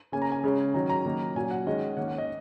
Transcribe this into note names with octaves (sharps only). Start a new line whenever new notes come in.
C#3 A#3 C#4 G#5
A#5
G#5
C#3 G#3 C#4
D#3 F#3 C#4 A#5
A#5
D#3 F#3 A#3 C#4
A#2 F#3 C#4 G#5
F#5
D#3 G#3 C#4 D#5
D#3 A#3 C#4 F#5
F#5
D#5